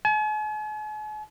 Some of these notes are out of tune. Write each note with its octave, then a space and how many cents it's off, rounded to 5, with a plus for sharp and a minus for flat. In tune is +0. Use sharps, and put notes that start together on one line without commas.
G#5 +45